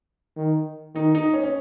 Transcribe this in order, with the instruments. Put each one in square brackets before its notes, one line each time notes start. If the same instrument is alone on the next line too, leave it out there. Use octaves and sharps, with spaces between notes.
[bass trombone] D#3
[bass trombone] D#3 [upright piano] D#4
[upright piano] D#4
C#4
C#4